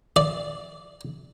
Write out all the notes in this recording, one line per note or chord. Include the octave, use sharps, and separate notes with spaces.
D5